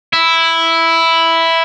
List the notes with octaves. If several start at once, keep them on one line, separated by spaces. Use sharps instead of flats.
E4